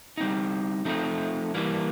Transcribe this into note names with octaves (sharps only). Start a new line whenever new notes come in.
G3 C4 D#4
F3 A3 C4 D#4
E3 G3 A#3